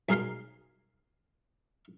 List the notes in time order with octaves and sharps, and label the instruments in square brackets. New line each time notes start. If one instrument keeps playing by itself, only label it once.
[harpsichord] B1 G#4 A#4 F5 C6